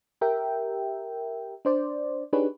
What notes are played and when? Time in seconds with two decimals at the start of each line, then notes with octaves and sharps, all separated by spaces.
0.21 G4 A#4 E5 G5
1.65 D4 C5 D5
2.33 D4 D#4 G4 G#4 B4 C#5